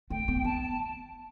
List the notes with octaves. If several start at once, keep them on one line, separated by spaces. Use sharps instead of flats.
A3 G5
B3
B3 A5